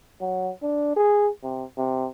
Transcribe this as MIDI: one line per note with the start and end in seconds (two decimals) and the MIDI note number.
0.21 0.51 54
0.62 0.93 62
0.96 1.29 68
1.44 1.65 48
1.77 2.08 48